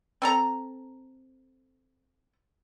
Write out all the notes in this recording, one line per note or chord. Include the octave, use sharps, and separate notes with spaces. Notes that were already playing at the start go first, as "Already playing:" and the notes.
C4 A4 A#5